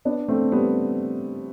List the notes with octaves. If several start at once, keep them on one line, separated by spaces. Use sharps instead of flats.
B3 D4
A3 C4
G3 B3